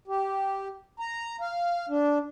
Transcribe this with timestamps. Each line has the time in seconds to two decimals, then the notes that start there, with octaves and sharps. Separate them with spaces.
0.08 G4
1.00 A#5
1.41 F5
1.89 D4